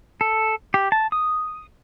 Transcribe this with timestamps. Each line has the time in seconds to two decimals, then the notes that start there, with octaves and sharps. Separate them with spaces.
0.21 A4
0.74 G4
0.92 A5
1.12 D#6